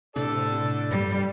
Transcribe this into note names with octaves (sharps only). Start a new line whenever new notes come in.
A2 C3 D4 A4 D5
G2 G3